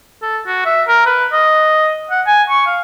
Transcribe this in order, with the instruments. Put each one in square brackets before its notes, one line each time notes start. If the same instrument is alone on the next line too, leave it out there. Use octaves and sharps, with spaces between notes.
[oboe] A4
F#4
E5
A#4
B4
D#5
F#5
G#5
C#6
F5